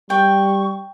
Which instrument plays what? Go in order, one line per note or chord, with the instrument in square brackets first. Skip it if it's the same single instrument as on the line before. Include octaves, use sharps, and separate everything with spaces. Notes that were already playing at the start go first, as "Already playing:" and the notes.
[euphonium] G3 [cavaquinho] G5 [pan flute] C#6